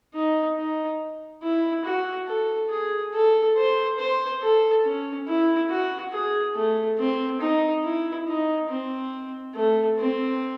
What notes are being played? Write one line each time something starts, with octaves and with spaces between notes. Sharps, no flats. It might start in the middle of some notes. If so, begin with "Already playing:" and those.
D#4
D#4
E4
F#4
A4
G#4
A4
C5
C5
A4
C#4
E4
F#4
G#4
A3
C4
D#4
E4
D#4
C4
A3
C4